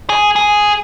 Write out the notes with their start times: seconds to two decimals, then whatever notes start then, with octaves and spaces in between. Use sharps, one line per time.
0.10 G#4
0.36 G#4